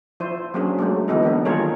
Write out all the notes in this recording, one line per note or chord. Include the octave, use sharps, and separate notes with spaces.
F3 E4 C5
F#3 A#3 C#4 D4 G#4
F#3 G#3 A3
D3 E3 B3 D#4 A4
A#3 B3 D4
D#3 G3 F4 G#4 A#4 C#5